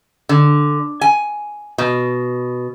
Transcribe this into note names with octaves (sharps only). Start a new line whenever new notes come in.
D3
G#5
B2